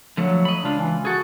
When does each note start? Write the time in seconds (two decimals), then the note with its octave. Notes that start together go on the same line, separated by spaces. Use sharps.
0.17 D3 F3 F#3 A3
0.45 D#5 B5
0.64 C#2 D4 F4
0.77 E3
1.05 F#4 G#4 A4